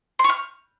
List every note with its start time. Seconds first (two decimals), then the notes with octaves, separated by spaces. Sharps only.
0.19 C6
0.24 C#5
0.29 F6